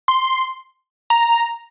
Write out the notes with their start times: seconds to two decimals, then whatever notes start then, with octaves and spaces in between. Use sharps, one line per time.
0.08 C6
1.10 A#5